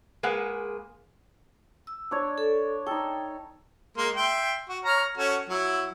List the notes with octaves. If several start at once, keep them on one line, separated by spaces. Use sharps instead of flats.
G#3 A#3 G#4 B4 F#5
E6
D4 C#5
A4
D#4 A4 G5
G#3 A#3 C6
E5 G5 C6
F#4
C#5 A#5 F6
C#4 F#4 A4
F#3 E4